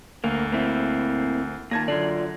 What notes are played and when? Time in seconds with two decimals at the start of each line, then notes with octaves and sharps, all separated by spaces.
0.24 D2 A#3
0.52 A#3 C4 E4
1.71 A#2 D#3 A5 G#6 A#6
1.88 F#2 D3 F4 D5